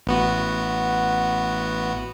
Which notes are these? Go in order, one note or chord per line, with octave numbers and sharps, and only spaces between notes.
A1 B3 F#4